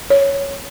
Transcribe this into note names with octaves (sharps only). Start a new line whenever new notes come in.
C#5